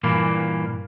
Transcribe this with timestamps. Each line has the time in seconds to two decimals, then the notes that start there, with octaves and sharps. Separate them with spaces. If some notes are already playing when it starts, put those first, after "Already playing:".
0.03 G2 A#2 E3 A#3